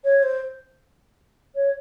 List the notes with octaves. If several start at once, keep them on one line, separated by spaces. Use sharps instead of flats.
C#5
C5
C#5